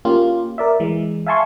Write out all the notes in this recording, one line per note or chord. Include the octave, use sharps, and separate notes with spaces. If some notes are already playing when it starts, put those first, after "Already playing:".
A#3 C#4 F4 G4
A#4 D5 E5
E3 G#3
E5 F5 G#5 A5 C6 C#6